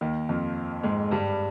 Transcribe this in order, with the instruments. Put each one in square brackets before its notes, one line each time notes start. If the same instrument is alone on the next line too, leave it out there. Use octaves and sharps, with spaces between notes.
[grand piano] D#2 D#3
F2 F3
G#2 G#3
G2 G3